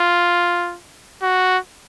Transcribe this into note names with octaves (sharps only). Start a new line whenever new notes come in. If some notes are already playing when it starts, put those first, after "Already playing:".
Already playing: F4
F#4